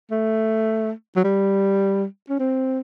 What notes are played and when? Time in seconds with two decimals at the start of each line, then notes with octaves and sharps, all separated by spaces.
0.11 A3
1.16 F#3
1.24 G3
2.29 C#4
2.39 C4